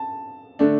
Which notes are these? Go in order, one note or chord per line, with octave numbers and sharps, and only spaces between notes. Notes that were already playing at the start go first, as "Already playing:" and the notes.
Already playing: A5
D3 A3 D4